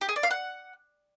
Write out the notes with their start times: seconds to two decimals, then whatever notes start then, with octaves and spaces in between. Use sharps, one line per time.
0.01 G4
0.09 G#4
0.16 D5
0.23 F5
0.31 F#5